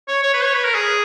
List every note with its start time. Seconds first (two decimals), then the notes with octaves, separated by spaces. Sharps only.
0.08 C#5
0.23 C#5
0.34 B4
0.43 C#5
0.54 B4
0.64 A#4
0.74 G#4